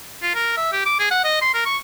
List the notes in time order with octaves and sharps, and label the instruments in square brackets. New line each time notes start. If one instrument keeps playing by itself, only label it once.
[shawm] F4
A#4
E5
G4
D6
G#4
F#5
D#5
C6
A#4
C#6